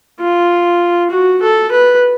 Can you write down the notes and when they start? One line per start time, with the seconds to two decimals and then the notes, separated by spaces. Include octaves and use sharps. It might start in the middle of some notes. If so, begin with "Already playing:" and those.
0.20 F4
1.10 F#4
1.42 A4
1.72 B4